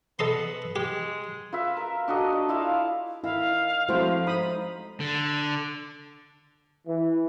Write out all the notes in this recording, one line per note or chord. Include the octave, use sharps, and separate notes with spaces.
B3 A4 D#5 C6
G#3 G4
F4 B4 E5
A#4
D4 F#4 A4 D#5
D5 D#5
E4 F4 E5 F5
D#3 E4 F5
F3 G#3 A3 C4 E4 F#4 C5
D#4 C5 B5 D#6
D3
E3